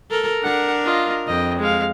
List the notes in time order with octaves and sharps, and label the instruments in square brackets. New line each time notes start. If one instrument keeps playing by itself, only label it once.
[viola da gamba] A4 A#4
[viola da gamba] D4 A#4 [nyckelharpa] F#5
[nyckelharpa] F4 D#5
[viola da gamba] F2 [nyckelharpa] D#5 G5
[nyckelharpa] G#3 F5